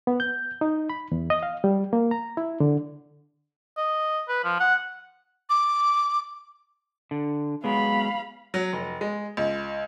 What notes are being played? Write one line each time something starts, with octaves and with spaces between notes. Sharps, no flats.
B3
G6
D#4
B5
E2
D#5
F5
G3
A#3
A#5
E4
D3
D#5
B4
F3
F#5
D6
D3
F#3 G#3 B3 F5 B5
F#3
F1
G#3
C#2